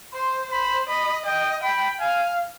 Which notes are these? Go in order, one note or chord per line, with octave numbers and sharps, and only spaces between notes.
C5 C6
C5 B5
D#5 B5
D#5 G5
G5 B5
F5 G#5